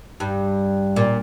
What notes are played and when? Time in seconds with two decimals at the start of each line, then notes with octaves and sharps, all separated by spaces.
0.20 G2
0.96 A#2